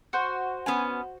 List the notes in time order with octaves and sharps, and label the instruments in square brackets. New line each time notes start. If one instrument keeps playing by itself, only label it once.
[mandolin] F#4 C5 F#5
[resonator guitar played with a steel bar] B3 C#4 G#5